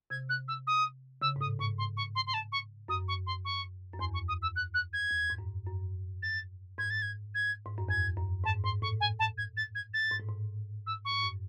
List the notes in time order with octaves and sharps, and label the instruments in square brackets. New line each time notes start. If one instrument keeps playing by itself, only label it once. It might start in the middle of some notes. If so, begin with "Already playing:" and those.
[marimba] C3 [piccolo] G#6
[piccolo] F#6
E6
D#6
[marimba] C#3 [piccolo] E6
[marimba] G#2
[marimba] A2 [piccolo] D#6
[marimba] G#2 [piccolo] C#6
[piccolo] C6
C#6
C6
C6
A5
C#6
[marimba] F#2 [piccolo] D#6
[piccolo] C#6
C6
C#6
[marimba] F#2
[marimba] E2 [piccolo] C6
[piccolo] C#6
D#6
E6
F#6
F#6
G#6
[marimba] E2
G#2
F#2
F#2
[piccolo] A6
[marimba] G#2 [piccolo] G#6
[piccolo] A6
G#6
G#6
[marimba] G#2
F#2
[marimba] E2 [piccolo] G#6
[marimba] F#2
[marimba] G#2 [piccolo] A5
[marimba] G#2 [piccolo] C6
[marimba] A2 [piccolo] C#6
[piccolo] G#5
A5
G#6
A6
G#6
A6
[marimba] G#2
A2
G#2
[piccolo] E6
C#6
[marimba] G#2
F#2